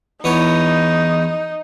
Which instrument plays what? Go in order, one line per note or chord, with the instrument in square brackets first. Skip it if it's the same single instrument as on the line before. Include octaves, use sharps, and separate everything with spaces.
[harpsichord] E2 B3 C#5 [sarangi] D#4